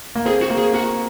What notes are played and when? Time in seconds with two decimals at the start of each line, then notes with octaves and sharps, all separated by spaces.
0.15 A#3
0.25 C4 G#4
0.42 F#4
0.50 A#3
0.58 G#4
0.74 A#3 F#4